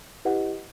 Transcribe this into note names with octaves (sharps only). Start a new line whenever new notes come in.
E4 G4 B4 D#5 F#5